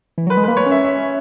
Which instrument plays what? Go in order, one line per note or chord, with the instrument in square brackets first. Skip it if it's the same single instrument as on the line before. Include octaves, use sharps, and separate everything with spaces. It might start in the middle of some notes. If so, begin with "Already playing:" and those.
[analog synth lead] E3
[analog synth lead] F#3 [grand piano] B4
[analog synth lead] G#3
[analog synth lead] A#3 [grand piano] B4
[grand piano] C#5
[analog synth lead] C#4
[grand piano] E5
E5